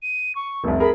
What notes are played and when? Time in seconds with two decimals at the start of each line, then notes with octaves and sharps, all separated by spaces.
0.02 D#7
0.35 C#6
0.64 F1 C2
0.80 G#4 A#4 B5